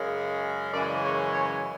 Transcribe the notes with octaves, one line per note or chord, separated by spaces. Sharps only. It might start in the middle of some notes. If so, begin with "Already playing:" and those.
Already playing: F#2 C#3 G#3
F#2 C#3 E3 G#3 D5
C#5
C#5